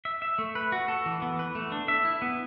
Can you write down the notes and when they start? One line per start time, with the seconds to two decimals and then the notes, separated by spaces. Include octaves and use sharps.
0.05 E5
0.22 E5
0.38 A3
0.55 B4
0.72 F#4
0.88 A4
1.06 E3
1.22 B3
1.39 B4
1.55 A3
1.72 D4
1.88 E5
2.05 E4
2.22 B3